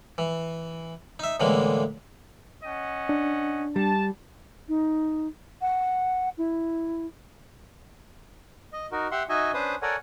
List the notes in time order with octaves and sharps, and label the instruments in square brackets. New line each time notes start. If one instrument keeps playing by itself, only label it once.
[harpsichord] E3
D#4 E5
A2 D3 E3 G#3 A#3
[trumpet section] C#4 D#5 F#5
[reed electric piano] D4
[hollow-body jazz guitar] G3 [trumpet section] A5
[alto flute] D#4
F#5
E4
[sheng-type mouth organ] D#5
D#4 F#4 A#4
G4 E5 F#5 C6
D#4 F#4 D#5 E5 G#5
C#4 D4 B4 C5 D#6
A4 A#4 C#5 D5 F#5 G#5